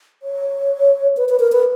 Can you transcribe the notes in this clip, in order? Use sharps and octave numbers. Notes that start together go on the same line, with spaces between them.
C#5
B4
B4
A#4
B4